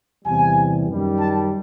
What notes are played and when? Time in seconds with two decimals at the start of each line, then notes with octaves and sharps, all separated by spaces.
0.25 E2 C3 E3 G3 G#5
0.88 F#2 D#3 G3
1.20 A5